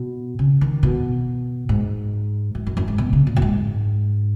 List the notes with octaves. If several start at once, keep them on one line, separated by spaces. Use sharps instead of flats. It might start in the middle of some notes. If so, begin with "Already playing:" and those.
Already playing: B2
C#3
D#3
B2
G#2
F#2
F#2
F#2
G#2
B2
C#3
A#2
F#2
G#2